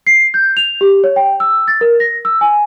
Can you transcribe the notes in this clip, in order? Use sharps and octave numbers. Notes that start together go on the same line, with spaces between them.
C7
G6
F7
G4
C#5
G5
E6
A6
A#4
A#6
E6
G#5